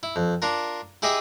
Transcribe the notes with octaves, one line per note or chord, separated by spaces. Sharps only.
E4
F2
D4 F4 A#4
E4 G4 G#4 D#5 E5